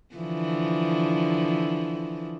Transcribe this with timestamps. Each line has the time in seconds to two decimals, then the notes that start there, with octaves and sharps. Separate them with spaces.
0.15 D3 E3 F3